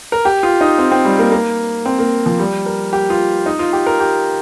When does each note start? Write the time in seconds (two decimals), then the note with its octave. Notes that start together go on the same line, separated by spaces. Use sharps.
0.12 A#4
0.25 G4
0.43 F4
0.61 D#4
0.78 C4
0.92 C4
1.05 G3
1.19 A#3
1.32 A#3
1.86 C4
1.99 A#3
2.26 F3
2.39 G3
2.66 A#4
2.93 G4
3.10 F4
3.46 D#4
3.59 F4
3.73 G4
3.86 A#4
4.00 G4